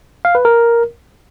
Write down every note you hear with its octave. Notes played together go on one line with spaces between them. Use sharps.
F5
B4
A#4